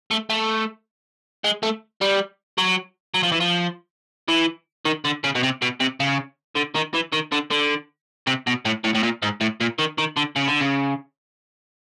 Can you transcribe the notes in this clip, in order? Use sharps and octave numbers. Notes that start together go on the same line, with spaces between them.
A3
A3
G#3
A3
G3
F#3
F#3
F3
E3
F3
E3
D#3
D3
C#3
B2
C3
B2
C3
C#3
D3
D#3
E3
D#3
D3
D3
C3
B2
A2
A2
A2
A#2
G#2
A2
A#2
D#3
D#3
D3
C#3
D3
C#3